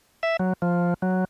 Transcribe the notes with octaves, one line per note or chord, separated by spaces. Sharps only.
E5
F#3
F3
F#3